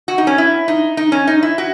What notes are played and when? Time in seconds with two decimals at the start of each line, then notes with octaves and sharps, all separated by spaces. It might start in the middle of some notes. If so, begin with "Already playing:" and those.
0.08 F#4
0.18 D#4
0.27 C#4
0.38 E4
0.68 D#4
0.97 D#4
1.12 C#4
1.27 D#4
1.43 E4
1.58 F#4